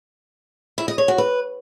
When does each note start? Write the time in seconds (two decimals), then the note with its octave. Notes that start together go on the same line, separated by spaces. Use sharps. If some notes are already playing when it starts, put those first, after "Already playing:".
0.78 E4
0.88 D#5
0.98 C#5
1.08 F#4
1.18 B4